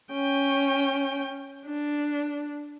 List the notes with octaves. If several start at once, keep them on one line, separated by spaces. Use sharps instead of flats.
C#4 G5
D4